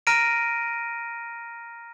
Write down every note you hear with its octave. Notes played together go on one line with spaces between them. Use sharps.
A#5 F6 A#6 D7 D#7